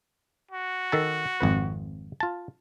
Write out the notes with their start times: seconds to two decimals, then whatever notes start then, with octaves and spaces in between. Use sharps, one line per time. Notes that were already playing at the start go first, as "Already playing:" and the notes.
0.51 F#4
0.92 D#3 A4 A5
1.40 G#1 F2 B4
2.20 F4 A5